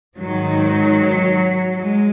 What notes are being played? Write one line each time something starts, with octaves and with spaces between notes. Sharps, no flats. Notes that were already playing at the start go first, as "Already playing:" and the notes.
G#2 D#3 F#3
G#3